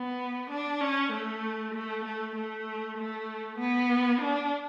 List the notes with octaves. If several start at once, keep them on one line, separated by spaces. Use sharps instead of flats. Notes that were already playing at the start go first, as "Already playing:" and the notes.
Already playing: B3
D4
C#4
A3
A3
A3
A3
A3
B3
D4